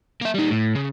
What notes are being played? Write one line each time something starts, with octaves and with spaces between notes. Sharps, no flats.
A#3 E5
G3 D#4
A2
C#3